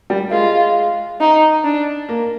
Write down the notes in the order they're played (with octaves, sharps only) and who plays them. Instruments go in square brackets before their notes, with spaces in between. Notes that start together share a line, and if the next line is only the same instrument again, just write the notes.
[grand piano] G3
[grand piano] G#3 [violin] F4
[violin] D#4
D4
[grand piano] A#3